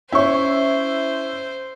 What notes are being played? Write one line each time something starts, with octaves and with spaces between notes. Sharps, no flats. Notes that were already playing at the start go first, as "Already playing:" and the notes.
C#4 E4 C5 C#5 C#6